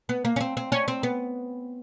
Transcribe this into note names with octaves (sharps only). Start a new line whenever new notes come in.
B3
A#3
C#4
C4
C4
C#4
C4
B3